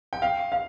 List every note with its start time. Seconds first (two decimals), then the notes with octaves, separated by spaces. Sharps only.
0.13 G5
0.22 F5
0.52 F5